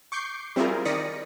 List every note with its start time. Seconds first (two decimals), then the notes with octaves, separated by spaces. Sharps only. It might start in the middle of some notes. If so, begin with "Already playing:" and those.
0.12 C#6 D6 G6 C7
0.56 G3 C4 E4 F4 G#4 A#4
0.85 D#3 D5 D#6 A#6 B6 C#7